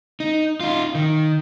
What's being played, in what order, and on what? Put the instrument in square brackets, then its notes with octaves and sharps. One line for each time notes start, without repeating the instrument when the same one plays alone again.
[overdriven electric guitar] D#4
D#4 F4
D#3